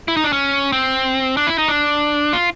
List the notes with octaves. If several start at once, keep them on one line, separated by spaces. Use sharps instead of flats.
E4
D#4
D4
C#4
C4
D4
E4
D#4
D4
F4